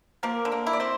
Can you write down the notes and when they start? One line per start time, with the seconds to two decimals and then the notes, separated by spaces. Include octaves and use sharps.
0.23 F3 A#3 A#4
0.45 D3
0.52 A#3 A#4
0.67 E4
0.73 D5
0.80 C4 C5